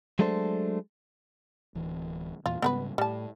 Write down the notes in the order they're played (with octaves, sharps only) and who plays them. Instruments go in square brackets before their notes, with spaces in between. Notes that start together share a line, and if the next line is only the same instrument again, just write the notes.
[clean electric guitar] F#3 G#3 A3 D4 A4 C5
[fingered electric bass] D1 E3
[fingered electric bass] E2 A#2 E3 [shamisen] F4
[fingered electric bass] G#2 C#3 G3 [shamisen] B3 A#4 B4
[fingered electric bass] A2 [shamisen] G3 A5